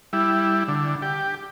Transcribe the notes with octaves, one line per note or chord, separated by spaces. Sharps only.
G3 E4
D3
G4